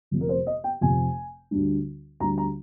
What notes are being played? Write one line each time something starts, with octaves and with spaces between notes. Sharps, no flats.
F1 F2 C3
A#4
C5
D#5
G5
F1 F2 C3 G#5
D2 D3 G3 D4
D2 D3 G3 D4 A#5
A#5